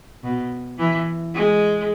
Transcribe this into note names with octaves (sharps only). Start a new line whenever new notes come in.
B2
E3
G#3